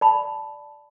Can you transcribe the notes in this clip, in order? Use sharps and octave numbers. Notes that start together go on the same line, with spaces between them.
D5 A5 B5